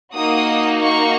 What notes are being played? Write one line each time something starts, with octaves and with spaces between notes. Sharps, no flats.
A#3 D#4 F#4 D#6
C#6